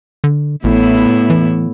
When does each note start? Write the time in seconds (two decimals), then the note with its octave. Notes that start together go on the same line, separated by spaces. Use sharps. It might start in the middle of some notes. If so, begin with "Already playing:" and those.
0.24 D3
0.64 A1 A2 B3 E4
1.30 E3